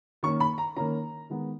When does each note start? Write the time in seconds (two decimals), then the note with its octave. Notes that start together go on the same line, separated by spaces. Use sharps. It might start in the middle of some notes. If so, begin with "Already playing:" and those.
0.23 D#3 A#3 C#4 C#6
0.40 B5
0.58 A#5
0.76 D#3 A#3 C#4 A#5
1.30 D#3 G#3 B3